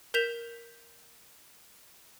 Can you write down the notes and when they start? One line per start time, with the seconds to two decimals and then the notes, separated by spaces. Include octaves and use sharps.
0.14 A#4 G6 B6 E7 F7